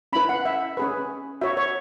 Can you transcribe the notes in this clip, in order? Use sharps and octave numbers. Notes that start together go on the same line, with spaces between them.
C#4 E4 B4 B5
F#5
E5
C#4 G#4 B4
F#4 C#5 E5
C#5